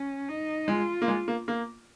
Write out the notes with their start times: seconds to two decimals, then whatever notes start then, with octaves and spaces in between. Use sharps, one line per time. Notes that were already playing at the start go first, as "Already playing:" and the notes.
Already playing: C#4
0.29 D#4
0.68 G#3 F4
1.02 A#3
1.08 G#3
1.28 A#3
1.48 A#3